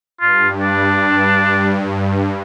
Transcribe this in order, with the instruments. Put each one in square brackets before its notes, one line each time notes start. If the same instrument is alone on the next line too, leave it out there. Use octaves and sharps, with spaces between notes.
[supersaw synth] G2 [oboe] F4
[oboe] D4